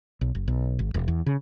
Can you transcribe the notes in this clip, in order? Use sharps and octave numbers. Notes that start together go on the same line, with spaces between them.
B1
F#1
B1
G#1
E1
E2
C#3